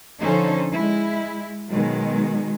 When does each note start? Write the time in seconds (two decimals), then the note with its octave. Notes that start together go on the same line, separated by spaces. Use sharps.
0.22 D3 F3 C#4 D#4 A4 C5
0.72 G#3 E4
1.70 B2 D#3 F#3 G#3